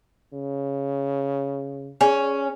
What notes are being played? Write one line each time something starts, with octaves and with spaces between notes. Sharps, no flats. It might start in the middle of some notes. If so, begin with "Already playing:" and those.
C#3
C#4 G#4 D5 G#5